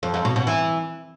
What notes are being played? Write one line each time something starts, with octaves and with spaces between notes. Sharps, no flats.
F2
F2
B2
B2
E3